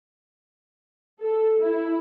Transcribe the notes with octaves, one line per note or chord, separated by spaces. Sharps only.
A4
E4